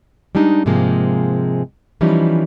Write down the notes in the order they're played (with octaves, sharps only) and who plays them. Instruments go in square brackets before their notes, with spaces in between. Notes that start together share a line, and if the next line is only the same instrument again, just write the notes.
[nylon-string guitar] G3 G#3 D4 D#4
G#2 C3 F3 G#3 A#3
E3 F3 G3 C#4 D#4